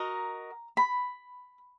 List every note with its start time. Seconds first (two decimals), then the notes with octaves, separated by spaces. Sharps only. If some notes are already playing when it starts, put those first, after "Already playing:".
Already playing: F#4 A#4 D#5 A#5
0.77 B5